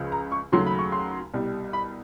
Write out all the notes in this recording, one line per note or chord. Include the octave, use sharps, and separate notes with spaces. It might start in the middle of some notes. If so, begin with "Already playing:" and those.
Already playing: C#2 C#3 F3
A#5
C#6
D#2 C#3 F#3 A3 C6
B5
C#6
C6
C2 B2 G3
B5